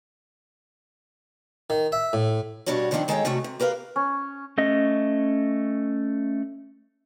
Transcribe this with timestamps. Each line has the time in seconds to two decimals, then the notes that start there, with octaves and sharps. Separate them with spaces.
1.70 D#3
1.92 E5
2.13 A2
2.66 G2 B2 G3 D4 F#4 C#5
2.91 D3 D#3 F3 C4 D4 F#5
3.08 D#3 G#3 A4 C#5 E5 G5
3.25 C3 G3 A3 F#4
3.44 C3
3.60 G4 A#4 B4 F5
3.96 C#4
4.58 A3 C#4 D#5